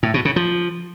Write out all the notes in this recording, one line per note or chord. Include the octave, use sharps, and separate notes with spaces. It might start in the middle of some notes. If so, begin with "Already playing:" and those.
A2
B2
C#3
F3